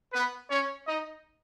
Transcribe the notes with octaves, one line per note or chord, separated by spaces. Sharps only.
B3 B4
C#4 C#5
D#4 D#5